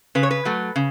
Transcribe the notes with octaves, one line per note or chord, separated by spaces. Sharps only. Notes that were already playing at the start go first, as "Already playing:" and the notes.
C#3 B4
C#5
B4
F#3 A3
C#3